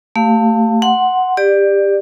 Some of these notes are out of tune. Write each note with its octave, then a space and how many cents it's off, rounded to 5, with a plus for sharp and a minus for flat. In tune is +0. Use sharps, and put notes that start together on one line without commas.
A3 +25 G4 +0 F5 +0
F#5 +0 C6 +0
G4 +20 D5 +15